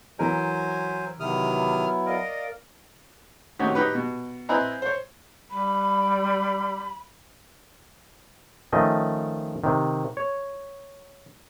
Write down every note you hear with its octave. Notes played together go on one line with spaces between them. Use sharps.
E3 F#3 A#4 C5 G#5
C3 D#3 F#3 B3 E4 D#6 F6
A#4 D5 D#5 F5
D#3 A3 C4 C#4 F#4 G4
D#4 G4 B4
B2
C4 E4 B4 D#5 G#5 A#5
C5 C#5
G3 B5
D#3 F3 A3 C#4 D#5
C3 D#3
C#5